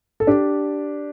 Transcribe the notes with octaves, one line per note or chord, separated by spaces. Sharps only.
A4
D4 G4